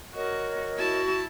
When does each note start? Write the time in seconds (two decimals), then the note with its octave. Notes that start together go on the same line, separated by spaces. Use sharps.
0.15 F#4 A#4 C#5 D#5
0.77 E4 F#4 A5